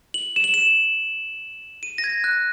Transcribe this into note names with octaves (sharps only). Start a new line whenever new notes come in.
F#7
E7
F#7
E7
D#7
A#6
G#6
F#6